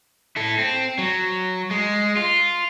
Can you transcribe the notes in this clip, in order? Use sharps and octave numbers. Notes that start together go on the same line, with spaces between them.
E4 A4
C4
F#3
G#3
F4